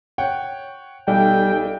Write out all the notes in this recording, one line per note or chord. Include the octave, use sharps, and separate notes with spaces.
C#5 F#5 G5
B1 G3 D#4 A4 G5